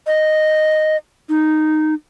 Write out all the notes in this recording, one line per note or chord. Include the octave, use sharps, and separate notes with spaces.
D#5
D#4